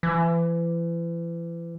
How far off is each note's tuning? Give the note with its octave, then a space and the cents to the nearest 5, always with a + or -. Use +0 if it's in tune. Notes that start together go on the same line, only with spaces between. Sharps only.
E3 +35